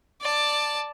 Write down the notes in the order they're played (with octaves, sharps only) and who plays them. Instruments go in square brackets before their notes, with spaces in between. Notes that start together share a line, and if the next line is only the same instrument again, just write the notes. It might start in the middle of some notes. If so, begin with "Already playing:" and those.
[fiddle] D5 A5